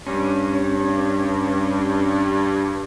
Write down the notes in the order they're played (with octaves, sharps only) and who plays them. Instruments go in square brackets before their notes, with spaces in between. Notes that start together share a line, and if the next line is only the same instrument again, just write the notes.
[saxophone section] G2 [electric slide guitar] C#4